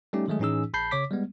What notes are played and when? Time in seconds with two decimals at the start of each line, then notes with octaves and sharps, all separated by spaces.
0.13 G3 A3 C#4 D#4 G4
0.28 D#3 F#3 G#3 A3 G#4
0.39 A2 E3 C#4 D#4 G#4 E6
0.73 A#1 A5 B5 G6 C7
0.91 C#3 C#5 D6 B6
1.11 G3 G#3 B3